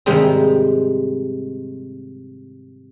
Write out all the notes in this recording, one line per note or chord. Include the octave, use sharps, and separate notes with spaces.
G#2 C3 D#3 G3 G#3